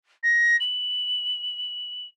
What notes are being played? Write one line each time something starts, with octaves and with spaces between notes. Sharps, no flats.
A#6
F#7